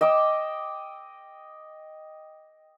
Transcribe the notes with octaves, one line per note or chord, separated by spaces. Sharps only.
D#5 G5 D6 E6